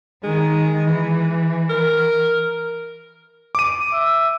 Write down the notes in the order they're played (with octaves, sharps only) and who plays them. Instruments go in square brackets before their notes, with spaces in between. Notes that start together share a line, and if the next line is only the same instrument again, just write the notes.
[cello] D#3 [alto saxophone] G#3
[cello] E3
[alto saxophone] A#4
[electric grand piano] D6 D#7
[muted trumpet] E5